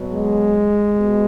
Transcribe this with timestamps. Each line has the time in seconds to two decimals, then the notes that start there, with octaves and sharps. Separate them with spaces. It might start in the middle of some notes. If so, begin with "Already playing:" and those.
Already playing: B2 F#3
0.13 G#3
0.97 B2